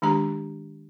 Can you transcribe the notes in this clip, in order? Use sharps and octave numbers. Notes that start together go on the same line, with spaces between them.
D#3 G#3 D4 G4 A#5